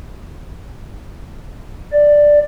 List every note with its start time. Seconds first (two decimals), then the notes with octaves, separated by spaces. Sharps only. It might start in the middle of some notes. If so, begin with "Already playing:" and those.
1.93 D5